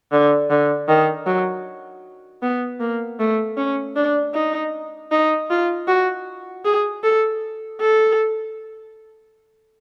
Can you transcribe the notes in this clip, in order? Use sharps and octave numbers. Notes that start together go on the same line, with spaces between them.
D3
D3
D#3
F#3
B3
A#3
A3
C#4
D4
D#4
D#4
F4
F#4
G#4
A4
A4